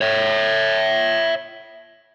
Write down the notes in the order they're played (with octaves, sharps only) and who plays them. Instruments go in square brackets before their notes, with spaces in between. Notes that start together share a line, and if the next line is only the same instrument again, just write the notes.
[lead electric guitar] C#5 E5